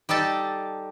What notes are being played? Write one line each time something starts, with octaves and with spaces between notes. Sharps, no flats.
G3 D#4 G4 A4 A5